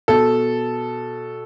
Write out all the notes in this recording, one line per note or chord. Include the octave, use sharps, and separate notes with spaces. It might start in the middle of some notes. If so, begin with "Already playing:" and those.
B2 A4